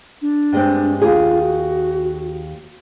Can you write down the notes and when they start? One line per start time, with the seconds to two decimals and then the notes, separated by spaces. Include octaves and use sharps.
0.22 D4
0.52 G2 G#3 C4
1.02 D#2 F4 G#4
1.42 F#4